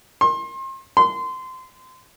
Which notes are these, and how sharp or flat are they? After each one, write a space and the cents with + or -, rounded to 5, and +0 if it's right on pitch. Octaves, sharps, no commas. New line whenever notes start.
C6 +35
C6 -25